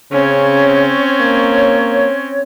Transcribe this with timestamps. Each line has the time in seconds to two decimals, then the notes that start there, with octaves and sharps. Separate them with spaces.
0.12 C#3 C4 C#4 C#5
1.21 A#3